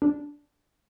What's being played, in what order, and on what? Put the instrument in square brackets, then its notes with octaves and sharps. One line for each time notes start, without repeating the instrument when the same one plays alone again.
[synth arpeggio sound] D4